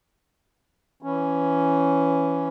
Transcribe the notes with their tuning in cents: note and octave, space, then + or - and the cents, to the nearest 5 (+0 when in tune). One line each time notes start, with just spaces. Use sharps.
E3 +10 C#4 +0